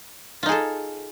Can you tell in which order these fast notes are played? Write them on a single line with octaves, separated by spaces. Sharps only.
F4 D#4 G#4 A4